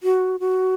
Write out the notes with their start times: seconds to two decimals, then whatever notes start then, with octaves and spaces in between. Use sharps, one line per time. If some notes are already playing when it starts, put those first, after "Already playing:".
0.03 F#4
0.40 F#4